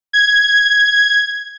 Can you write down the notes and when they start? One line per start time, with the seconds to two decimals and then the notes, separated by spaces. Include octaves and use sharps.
0.13 G#6